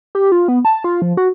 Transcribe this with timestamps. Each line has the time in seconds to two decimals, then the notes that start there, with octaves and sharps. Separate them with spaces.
0.15 G4
0.32 F4
0.48 B3
0.65 A5
0.84 F4
1.02 F3
1.17 F#4